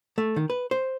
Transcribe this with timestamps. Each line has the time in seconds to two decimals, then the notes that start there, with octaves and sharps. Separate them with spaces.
0.18 A3
0.36 D#3
0.50 B4
0.71 C5